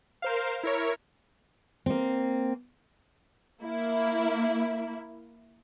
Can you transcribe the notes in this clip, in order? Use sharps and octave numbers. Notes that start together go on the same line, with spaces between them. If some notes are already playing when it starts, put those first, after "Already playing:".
A#4 C5 F5
E4 A#4 C#5
A#3 C4
A#3 E4